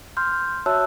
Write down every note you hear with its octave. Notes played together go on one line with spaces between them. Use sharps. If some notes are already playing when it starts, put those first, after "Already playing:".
C6 F6 G6
F#4 C#5 E5 A5 E6 F#6